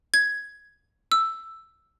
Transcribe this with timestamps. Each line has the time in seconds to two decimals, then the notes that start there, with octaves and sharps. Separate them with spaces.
0.14 G#6
1.12 E6